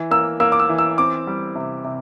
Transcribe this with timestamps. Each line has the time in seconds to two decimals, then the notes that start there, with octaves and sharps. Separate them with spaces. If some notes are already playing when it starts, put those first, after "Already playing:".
Already playing: E3
0.11 A#3 E6
0.40 A#3 E6
0.52 D6
0.60 E6
0.69 E3
0.78 E6
0.98 C4 D6
1.27 G3
1.55 C3
1.84 C3